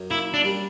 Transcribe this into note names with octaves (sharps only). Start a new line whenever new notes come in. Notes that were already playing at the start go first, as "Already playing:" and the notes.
Already playing: F#2
A#3 E4
D4
G3